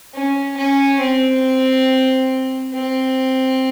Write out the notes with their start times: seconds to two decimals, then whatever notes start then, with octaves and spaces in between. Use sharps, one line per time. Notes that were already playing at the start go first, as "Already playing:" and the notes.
0.14 C#4
0.57 C#4
1.00 C4
2.73 C4